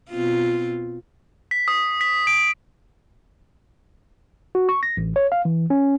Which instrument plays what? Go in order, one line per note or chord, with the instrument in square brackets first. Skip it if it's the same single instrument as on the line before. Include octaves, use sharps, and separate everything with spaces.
[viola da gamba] B2 C4 F4
[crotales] B6
D#6
B6
D7
[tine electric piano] F#4
C#6
A#6
A1
C#5
F5
E3
C#4